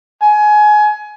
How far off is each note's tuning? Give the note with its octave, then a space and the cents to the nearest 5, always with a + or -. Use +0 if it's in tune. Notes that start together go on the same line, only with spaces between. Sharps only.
G#5 +25